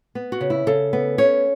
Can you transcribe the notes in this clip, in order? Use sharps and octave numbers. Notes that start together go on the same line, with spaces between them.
B3
F#4
C#3
E4
C#3 A4
B3
C#4 C#5